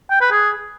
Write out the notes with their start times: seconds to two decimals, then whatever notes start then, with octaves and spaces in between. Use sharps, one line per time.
0.11 G5
0.21 B4
0.32 G#4